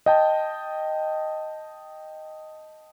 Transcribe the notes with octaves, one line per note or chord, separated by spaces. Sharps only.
D#5 G5 A5